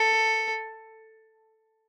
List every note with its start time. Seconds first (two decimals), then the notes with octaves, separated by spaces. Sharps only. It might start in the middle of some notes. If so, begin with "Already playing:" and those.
Already playing: A4